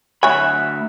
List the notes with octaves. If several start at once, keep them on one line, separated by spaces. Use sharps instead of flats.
D2 C#5 E5 G#5 B5 F#6